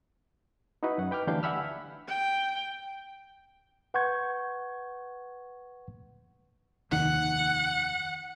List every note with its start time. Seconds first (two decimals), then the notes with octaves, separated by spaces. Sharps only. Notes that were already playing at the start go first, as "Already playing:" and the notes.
0.83 D#4 E4 F#4 B4
0.98 F#2 F#5
1.11 B4 G5 D6 F6
1.27 D2 E3 D4 G4 F5 G6
1.43 E5 F#5 G#5 B5 E6 F6
2.08 G5
3.94 B4 F#5 C6 C#6 G6 G#6
6.91 F1 D#2 D#3 F#5